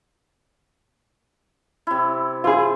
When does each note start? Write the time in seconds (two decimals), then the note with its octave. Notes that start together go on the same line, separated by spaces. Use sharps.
1.87 C3 E4
2.44 E4 F4 G#4 C5